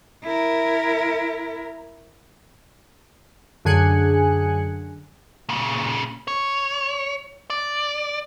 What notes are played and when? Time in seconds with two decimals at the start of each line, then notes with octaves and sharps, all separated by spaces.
0.24 E4 A#4
3.65 F#2 D3 G#4 G#5 F#6 C#7
5.49 A#2 C#3
6.28 C#5
7.50 D5